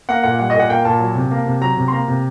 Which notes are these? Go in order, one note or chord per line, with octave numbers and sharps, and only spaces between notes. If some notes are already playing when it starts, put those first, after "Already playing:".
A#3 F#5
A#2 F#5
G3 F#5
D#5
A#2 F#5
A#3 G5
A#2 A5
F#3
C3
A#3
C3
F#3 A#5
C3
C6
A#3 A#5
C3